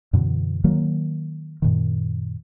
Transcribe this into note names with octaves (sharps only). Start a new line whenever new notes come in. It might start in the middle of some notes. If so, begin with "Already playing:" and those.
F#2 B2 D3 E3
D#3 F#3 A#3
F#2 A#2 D#3